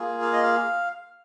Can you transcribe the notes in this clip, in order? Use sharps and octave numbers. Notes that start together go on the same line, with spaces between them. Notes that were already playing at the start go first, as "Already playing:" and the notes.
Already playing: A#3 F4 G#4
F5
D#5
F5